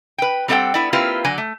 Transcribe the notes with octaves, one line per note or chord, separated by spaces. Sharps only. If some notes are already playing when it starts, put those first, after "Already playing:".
B4 G5
G3 C4 A4 D5 F#5 G5
B3 E4 D5
A#3 C4 E4 F4 G4 B4
D3 F#3 D5 G#5
A3